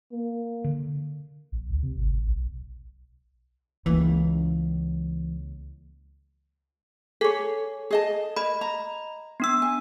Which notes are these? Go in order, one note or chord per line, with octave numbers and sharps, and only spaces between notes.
A#3
D3
A#1
D2
C3
G#1
A1
B1
C#2 E3 A#3
G#4 A4 C#5
G#4 D#5 A5
A#4 D#5 B5
A#5
B3 D4 E6
G#5